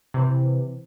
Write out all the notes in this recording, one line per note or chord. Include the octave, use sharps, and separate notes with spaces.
C3 E3